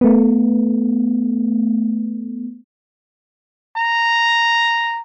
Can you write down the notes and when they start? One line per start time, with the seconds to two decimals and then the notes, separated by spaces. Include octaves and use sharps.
0.01 A3 B3
3.76 A#5